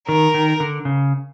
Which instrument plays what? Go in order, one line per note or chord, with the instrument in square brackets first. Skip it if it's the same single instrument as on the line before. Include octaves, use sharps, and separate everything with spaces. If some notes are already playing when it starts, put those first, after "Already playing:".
[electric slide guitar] D#3 [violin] A#4
[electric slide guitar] D#3
D3
C#3